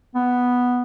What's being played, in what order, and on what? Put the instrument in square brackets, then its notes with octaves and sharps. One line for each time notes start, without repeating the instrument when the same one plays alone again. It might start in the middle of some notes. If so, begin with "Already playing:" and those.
[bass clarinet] B3